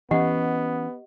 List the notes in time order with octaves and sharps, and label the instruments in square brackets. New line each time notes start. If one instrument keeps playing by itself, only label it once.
[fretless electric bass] E3 C#4 [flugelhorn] B3 [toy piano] G4 D#5 F#5